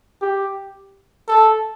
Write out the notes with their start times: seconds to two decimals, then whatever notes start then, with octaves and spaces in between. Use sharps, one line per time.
0.21 G4
1.28 A4